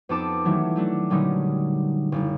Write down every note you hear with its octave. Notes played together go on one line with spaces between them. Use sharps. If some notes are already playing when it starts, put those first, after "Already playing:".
F2 B3 D#4 A5 D6 E6
D#3 E3 F#3 A3
F#3 A3 D4
A#2 D3 F#3 G3 C#4 D#4
F#1